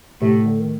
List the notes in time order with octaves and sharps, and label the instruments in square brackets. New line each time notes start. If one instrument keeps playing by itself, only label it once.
[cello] A2 [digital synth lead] C3
[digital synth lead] D3
D#3